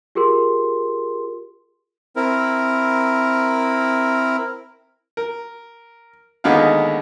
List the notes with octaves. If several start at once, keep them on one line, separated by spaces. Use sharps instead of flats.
F4 G4 G#4 A#4 C6
C4 E4 A#4
A#4
D#2 D3 G#3 B3 D#4 F5